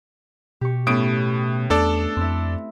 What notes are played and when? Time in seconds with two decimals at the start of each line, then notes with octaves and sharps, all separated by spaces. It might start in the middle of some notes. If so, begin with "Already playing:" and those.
0.61 B2 G4 C#6
0.87 A2 A3 B3 C#4 D#6 D7
1.70 E2 A3 D4 A4 D5
2.17 F2 C4 E4